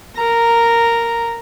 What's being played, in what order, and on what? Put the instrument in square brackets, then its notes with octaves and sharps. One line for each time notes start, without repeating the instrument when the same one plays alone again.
[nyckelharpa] A#4 A#5